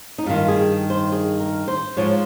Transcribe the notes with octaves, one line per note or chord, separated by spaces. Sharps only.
D#4
G2 D#3 F4
G#4
C5
G#4
A#4
C5
G#2 F3 C#5